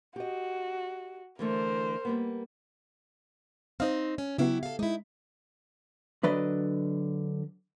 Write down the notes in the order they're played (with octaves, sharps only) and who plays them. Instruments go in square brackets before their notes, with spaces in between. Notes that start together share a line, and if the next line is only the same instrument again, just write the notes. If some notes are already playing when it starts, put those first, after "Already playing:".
[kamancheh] F#4 [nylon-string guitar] G4 D#5
[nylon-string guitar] D3 E3 A3 [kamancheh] A#4 C5
[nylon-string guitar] G3 A#3 B3
[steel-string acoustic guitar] C4 D#4 [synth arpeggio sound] C5 D#5 F5
[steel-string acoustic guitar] C#4
[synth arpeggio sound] C#3 B3 F#4 [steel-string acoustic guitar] F#3 E4 G4
[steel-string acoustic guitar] A4 F5
[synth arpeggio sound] G#3 [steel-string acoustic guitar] D#4 E4
[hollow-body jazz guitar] D3 F#3 B4 D5 D#5